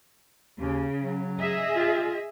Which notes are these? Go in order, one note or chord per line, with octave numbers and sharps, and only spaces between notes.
D#2 C#3
F#3
G#4 D#5 E5
F4